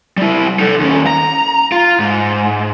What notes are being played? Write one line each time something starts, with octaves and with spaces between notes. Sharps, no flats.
G3 E4
D#4 A4
D#2 C#4
A#5
F4
G#2